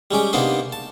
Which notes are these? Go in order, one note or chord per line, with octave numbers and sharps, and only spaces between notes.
G3 G#3 C#4 G4
C3 A#3 B3 D4 D#4 C5
A5